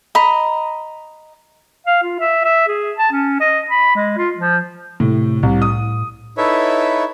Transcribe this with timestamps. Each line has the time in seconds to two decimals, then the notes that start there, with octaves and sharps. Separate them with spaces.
0.15 D#5 A#5 B5
1.87 F5
2.03 F4
2.20 E5
2.44 E5
2.68 G#4
2.97 A5
3.12 C#4
3.40 D#5
3.70 B5
3.96 G#3
4.18 F4
4.38 F3
5.00 A2 C3
5.43 C2 A2
5.62 D#6
6.37 D#4 E4 A4 B4 C#5 E5